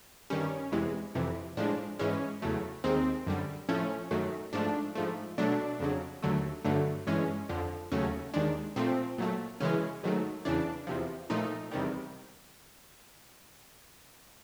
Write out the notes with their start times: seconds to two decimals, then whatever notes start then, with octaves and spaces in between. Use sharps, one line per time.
0.30 G2 D#3 G3 C#4
0.72 E2 C3 E3 G#3
1.15 F2 C3 E3
1.57 A2 F3 G#3 D4
1.99 G#2 E3 G#3 C#4
2.42 E2 C#3 F#3 A3
2.84 D#2 D#3 G#3 C4
3.27 F#2 D3 G3
3.69 A2 F3 A3 C#4
4.11 F#2 D#3 F#3 A3
4.53 G#2 F3 A3 D4
4.95 G#2 F3 A3
5.38 B2 F#3 A3 D4
5.80 F2 C#3 F#3
6.23 D#2 D3 F#3 A3
6.65 G2 D3 F#3 A3
7.07 G2 E3 G#3 C#4
7.49 F2 D3 F3
7.92 D#2 C#3 F#3 A3 C#4
8.34 D#2 D#3 G#3 D4
8.76 A#2 F3 A3 C4
9.18 A#2 F#3 A3
9.60 F#2 C#3 E3 G#3 C#4
10.03 G#2 D#3 F#3 A3
10.45 E2 C#3 E3 D4
10.87 E2 C3 F3
11.30 A#2 F3 A3 D#4
11.72 E2 C3 D#3 G3